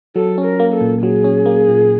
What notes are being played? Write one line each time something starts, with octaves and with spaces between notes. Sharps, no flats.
F#3 A4
C#4
A#4
A#3
A4
A#2
F#3 G#4
C#4
A#3
A#2